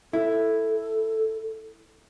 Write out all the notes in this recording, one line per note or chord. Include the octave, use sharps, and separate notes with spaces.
E4 A4